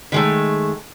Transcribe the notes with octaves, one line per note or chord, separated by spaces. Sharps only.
D#3 G#3 A3